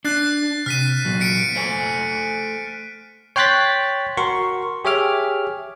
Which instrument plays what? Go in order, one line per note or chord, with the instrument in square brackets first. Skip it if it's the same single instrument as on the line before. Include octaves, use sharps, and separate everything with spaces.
[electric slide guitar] D4 [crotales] F#6 A6 C7
[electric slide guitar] C3 [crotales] F6 B6 D#7
[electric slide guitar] A#2 F#3
[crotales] B6 C#7 D7
[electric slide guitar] A3 C5 G#5
[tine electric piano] C#5 G5 C6 F#6 A6 B6
F#4 A#4 C6 C#6
G4 G#4 C#5 E5 D6 F6